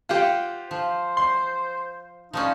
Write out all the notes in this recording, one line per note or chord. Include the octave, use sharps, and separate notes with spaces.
F4 G4 C5 F#5 G5
F3 C5
C6
F3 G3 C#4 D#4